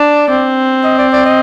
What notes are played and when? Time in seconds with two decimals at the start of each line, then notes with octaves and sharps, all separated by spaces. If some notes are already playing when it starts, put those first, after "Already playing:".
Already playing: D4 D5
0.29 C4
0.84 D#5
0.98 D5
1.12 D5
1.25 D#5